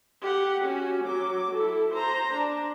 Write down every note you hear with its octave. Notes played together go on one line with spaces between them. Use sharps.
G4 F#5
C#4 F#4
F#3 D6
E4 A4
C5 A#5
D4